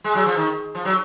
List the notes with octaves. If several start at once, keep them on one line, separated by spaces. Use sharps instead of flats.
G#3
F#3
F3
D#3
F3
F#3